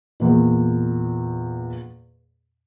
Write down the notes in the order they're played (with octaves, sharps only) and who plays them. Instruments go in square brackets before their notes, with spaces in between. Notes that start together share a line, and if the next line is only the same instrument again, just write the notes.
[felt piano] E2 A#2